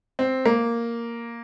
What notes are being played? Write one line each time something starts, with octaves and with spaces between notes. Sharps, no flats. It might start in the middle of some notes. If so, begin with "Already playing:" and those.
C4
A#3